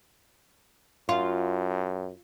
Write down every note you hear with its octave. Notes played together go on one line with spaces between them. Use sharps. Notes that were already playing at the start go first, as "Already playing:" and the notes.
F#2 F4